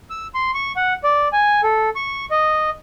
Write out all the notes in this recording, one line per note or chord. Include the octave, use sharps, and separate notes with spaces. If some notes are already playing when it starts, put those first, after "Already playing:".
E6
C6
C#6
F#5
D5
G#5
A4
C#6
D#5